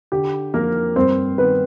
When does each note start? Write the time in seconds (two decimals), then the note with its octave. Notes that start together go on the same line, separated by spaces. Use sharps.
0.12 D3 G4
0.54 F2 A#3 A#4
0.96 G2 C4 C5
1.38 D#3 B3 B4